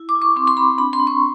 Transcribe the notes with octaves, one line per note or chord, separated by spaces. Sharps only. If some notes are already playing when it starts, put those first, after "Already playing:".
Already playing: E4
D6
E4
C#6
C4 C6
C6
C4 B5
D4 B5
C6
D4
C#6